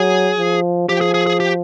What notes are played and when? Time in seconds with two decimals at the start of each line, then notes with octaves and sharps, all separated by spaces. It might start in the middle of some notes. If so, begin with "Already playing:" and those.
Already playing: F#3 G#4
0.39 F3
0.89 F3 G4
1.01 G#4
1.14 G#4
1.27 G#4
1.40 G4